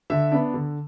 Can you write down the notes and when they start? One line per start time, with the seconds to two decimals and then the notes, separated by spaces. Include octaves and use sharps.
0.10 D3 E5
0.32 B3 D4
0.54 D3